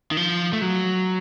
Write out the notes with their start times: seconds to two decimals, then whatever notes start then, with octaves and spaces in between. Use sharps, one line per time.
0.11 D#3
0.17 F3
0.53 A3
0.62 F#3